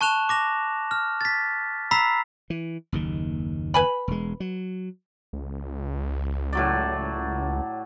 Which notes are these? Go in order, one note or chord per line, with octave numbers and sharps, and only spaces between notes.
A5 C#6 F#6 E7 F7
D6 A#6 F7
F6
A6 B6
A#5 B5 E6 B6 C7
E3
F#1 D#2 D#3
B4 G#5 B5
E1 G#3
F#3
C#2
A2 F#3 D5